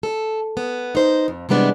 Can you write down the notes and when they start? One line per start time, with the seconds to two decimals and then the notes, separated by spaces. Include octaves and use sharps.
0.03 A4
0.57 B3
0.95 D#4 C5
1.28 F2
1.49 C3 E3 G3 G#3 B3 D4